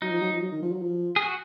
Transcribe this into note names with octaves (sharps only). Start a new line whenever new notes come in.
F#3 D#4
F3
F#3
F3
F#3
D#3
F3
F#3
F3
G#4
F#4